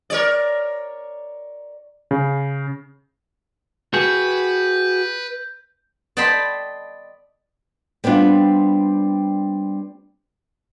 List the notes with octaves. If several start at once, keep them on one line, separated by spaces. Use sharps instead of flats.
A#4 C#5 D5
C#3
F#4 G#4 B4 G6
D5 D#5 G5 A5 B5 C6
G3 B3 C4 D4 F4